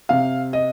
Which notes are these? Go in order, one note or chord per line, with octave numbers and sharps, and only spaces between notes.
C3 F5
D#5